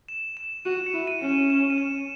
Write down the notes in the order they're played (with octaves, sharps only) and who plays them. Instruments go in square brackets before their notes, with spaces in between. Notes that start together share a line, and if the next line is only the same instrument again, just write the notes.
[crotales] E7
E7
[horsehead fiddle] F#4 [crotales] D#7
[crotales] C#7
[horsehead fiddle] E4
[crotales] D#7
[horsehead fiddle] C#4
[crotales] E7
E7
D#7
E7